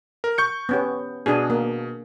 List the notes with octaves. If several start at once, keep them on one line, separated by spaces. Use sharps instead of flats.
A#4
C#6 G6 C#7
B3 C#4 G4
B2 D4 G#4
A#3